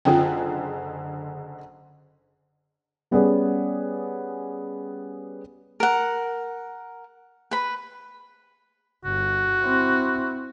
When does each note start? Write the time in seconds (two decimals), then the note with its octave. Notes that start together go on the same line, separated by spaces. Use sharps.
0.05 F#1 D3 F4 G#4 G5
3.11 G3 B3 C#4 G#4 B4 D5
5.80 A#4 F#5
7.51 B4 B5
9.05 G1 F#4
9.62 C4 E4